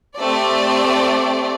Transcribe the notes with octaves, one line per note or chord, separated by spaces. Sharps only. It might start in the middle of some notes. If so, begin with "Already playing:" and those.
A3 C4 G4 D5